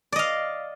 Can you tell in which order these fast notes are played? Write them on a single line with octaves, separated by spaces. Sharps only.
D5 D#5 F5